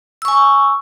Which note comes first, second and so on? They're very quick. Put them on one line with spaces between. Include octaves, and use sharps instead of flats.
E6 C#6 G#5